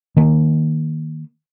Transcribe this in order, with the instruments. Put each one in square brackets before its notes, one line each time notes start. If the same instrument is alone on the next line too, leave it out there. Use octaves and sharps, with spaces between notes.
[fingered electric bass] D#3 A#3